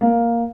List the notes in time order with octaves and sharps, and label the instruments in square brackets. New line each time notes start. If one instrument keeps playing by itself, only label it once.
[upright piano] A#3